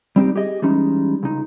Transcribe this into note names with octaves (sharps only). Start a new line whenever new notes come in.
G3 C4 D#4 G4
G4 G#4 D#5
E3 G3 G#3 C#4 D#4
C#2 D#4